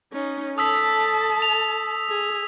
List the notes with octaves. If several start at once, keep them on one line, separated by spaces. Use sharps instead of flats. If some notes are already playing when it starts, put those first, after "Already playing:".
C#4 D#4
A4 A5 D#6 E6 B6
F7
G#4